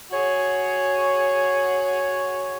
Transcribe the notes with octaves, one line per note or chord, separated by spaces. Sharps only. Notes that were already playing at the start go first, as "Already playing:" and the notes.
F#4 G#4 C#5